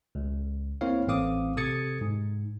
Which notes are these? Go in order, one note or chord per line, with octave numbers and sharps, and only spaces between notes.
C#2
A#3 C4 E4 C#5 F5
A1 C4 F5 D6 D#6
C3 A4 D#6 G#6 A6 C#7
G#2